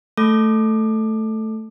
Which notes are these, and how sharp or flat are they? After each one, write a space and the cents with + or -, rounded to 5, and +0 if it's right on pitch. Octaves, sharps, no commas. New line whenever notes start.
A3 +0 A4 +0 D6 +25